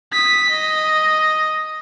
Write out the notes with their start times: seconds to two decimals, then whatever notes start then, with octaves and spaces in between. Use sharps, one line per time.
0.13 D#6 B6
0.50 D#5